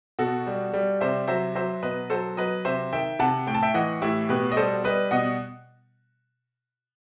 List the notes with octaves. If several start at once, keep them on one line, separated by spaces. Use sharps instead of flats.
B2 F#4 A4
G3
G3
C3 C5 E5
F#3 C5 E5
F#3 C5 E5
B2 B4 D#5
F#3 A4 C5
F#3 B4 D#5
C3 C5 E5
D#3 E5 G5
C3 F#5 A5
A2 G5
A5
E5 G5
E3 D#5 F#5
A2 E4 G4
B2 G4 B4
D#5
G3 A4 C5
G3 B4 D#5
B2 D#5 F#5